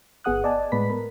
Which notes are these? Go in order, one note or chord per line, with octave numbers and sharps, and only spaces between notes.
G1 B3 G#4 F#5 D#6 F#6
D5 D#5 G#5 A5
A2 G#3 B3 B4 B5 B6
A#4 B5